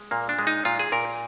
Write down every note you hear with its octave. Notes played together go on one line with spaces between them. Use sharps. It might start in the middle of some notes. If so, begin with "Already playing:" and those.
Already playing: G#3
A#2 A#3
D4
G#3
D#4
A#2 F4
G#4
A#2 A#4